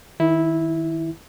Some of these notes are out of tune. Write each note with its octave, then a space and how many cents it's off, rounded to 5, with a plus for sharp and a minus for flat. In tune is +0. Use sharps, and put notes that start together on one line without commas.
D#3 +20 E4 -10